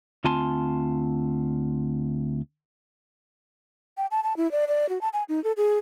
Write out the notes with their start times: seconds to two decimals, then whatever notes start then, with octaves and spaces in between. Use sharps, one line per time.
0.24 D2 C4 F4 G#5 A5 C6
3.97 G5
4.11 A5
4.23 A5
4.37 E4
4.52 D5
4.68 D5
4.89 F#4
5.01 A5
5.13 G#5
5.29 D#4
5.44 A4
5.57 G#4